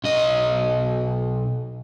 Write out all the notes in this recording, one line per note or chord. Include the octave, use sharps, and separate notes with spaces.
B1 D#5